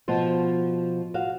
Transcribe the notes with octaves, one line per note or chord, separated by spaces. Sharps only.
B2 F3 C5
F#4 F5